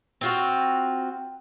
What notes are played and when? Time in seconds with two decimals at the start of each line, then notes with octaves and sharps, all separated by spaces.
0.21 C4 F4 F#4